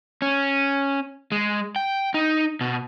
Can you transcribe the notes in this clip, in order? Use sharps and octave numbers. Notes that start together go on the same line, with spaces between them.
C#4
G#3
G5
D#4
B2